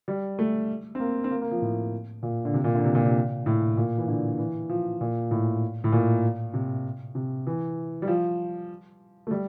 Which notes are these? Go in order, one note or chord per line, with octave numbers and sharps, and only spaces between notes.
G3
A3
C4
A#3
C4
A#3
A#3
F3
A2
A#2
D3
C3
A#2
D3
C3
A#2
C3
A2
A#2
E3
D3
E3
F3
A#2
A2
A2
A#2
C3
C3
E3
G3
F3
A3
G3